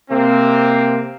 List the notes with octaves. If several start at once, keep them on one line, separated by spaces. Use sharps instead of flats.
C3 A#3 C4